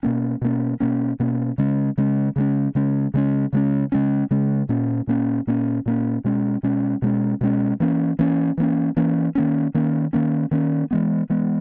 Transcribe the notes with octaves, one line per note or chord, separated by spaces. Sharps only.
B2 A#3 C#4
B2 A#3 C#4
B2 A#3 C#4
B2 A#3 C#4
C#3 G#3 C#4
C#3 G#3 C#4
C#3 G#3 C#4
C#3 G#3 C#4
C#3 G#3 C#4
C#3 G#3 C#4
C#3 G#3 C#4
C#3 G#3 C#4
A#2 A#3 C#4
A#2 A#3 C#4
A#2 A#3 C#4
A#2 A#3 C#4
B2 G#3 C#4
B2 G#3 C#4
B2 G#3 C#4
B2 G#3 C#4
E3 A#3 C#4
E3 A#3 C#4
E3 A#3 C#4
E3 A#3 C#4
D#3 A#3 C#4
D#3 A#3 C#4
D#3 A#3 C#4
D#3 A#3 C#4
E3 G#3 B3
E3 G#3 B3